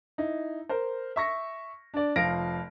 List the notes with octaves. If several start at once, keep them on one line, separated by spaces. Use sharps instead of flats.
D#4 E4
A#4 C5
E5 C#6 A#6
D4 D5
F1 F3 F5 A#6 D7